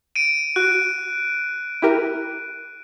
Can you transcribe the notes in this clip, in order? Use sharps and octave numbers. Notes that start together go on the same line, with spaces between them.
D7 D#7
F#4 F#6
E4 G4 A#4